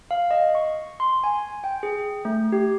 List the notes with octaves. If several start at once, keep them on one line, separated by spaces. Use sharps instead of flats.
F5
D#5
C#6
C6
G#5
G5
G#4
A3
G4